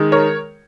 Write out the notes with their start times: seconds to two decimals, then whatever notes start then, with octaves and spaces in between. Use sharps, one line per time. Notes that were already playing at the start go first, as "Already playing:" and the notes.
Already playing: D#3 G#3
0.12 A#4 C#5